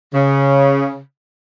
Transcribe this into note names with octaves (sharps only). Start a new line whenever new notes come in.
C#3